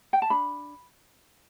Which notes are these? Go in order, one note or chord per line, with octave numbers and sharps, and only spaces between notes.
G5
A5
D4 B5